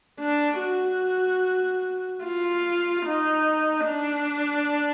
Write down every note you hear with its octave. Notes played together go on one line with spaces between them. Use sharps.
D4
F#4
F4
D#4
D4